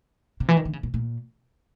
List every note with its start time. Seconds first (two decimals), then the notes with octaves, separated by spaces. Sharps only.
0.40 C3
0.48 E3
0.57 D#3
0.65 D3
0.73 C#3
0.83 B2
0.94 A#2